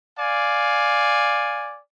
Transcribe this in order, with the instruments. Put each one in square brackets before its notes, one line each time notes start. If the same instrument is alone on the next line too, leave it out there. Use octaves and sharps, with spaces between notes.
[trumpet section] D5 F5 G#5